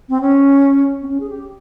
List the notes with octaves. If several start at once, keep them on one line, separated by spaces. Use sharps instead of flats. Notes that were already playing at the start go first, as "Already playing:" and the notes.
C4
C#4
C4
C#4
G#4
G4